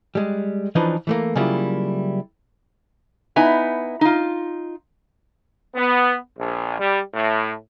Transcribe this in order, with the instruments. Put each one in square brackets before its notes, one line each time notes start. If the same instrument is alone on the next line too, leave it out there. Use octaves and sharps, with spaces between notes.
[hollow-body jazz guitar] G3 G#3
E3 F3 D4 D#4 B4
E3 A3 A#3
C#3 F#3 G3 A#3 E4 F4
[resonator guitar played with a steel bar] B3 D#4 E4 G#5
D#4 F4
[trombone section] B3
A#1
G3
A2